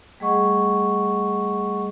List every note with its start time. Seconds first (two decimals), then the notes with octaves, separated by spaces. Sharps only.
0.20 G3 A3 G#4 D#5 F#5 C#6